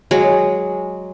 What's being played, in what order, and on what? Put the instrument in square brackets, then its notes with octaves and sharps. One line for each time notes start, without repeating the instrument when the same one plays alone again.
[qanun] F#3 G#3